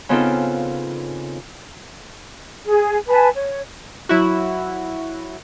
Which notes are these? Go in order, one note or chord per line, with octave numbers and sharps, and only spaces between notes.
C#3 B3 C4 D#4 F4 A4
G#4
B4 G#5 A5
C#5
F#3 E4 F#4